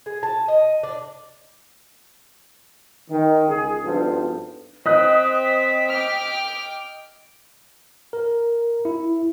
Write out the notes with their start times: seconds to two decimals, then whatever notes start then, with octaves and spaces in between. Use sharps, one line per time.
0.06 G#4
0.23 A5
0.48 D#5
0.83 D4
3.10 D#3
3.48 C#2 G#4
3.84 G#1 G2 F3 B3 A4
4.86 C4 D#5 D#6 F#6 B6
5.91 G5 D6 F6
8.13 A#4
8.85 E4